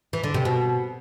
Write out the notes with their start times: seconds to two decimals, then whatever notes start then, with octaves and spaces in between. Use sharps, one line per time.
0.13 E3
0.23 D3
0.34 C3
0.45 B2